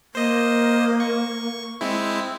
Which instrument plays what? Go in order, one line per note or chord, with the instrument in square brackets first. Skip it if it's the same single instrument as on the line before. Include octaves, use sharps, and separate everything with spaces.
[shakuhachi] A#3 [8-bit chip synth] C5 D#5
[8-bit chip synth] C#6
G#3 C4 E4